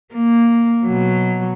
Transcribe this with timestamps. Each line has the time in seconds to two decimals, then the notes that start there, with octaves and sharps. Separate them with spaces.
0.14 A#3
0.86 B2 F#3